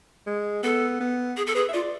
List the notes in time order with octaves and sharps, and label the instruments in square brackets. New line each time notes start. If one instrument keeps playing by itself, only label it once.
[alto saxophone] G#3
[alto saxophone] B3 [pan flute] A4
[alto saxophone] B3
[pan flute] G#4
A4
[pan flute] G#4 [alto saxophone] B4
[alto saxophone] E5
[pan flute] F4 [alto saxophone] D5